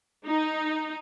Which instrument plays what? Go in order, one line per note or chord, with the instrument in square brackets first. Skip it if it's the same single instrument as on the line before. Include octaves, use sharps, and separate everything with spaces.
[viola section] D#4